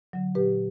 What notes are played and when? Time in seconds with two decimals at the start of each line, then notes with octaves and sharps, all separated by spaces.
0.13 D3 F#3
0.35 A#2 G4 B4